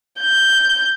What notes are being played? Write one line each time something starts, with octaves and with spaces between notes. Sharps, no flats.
G6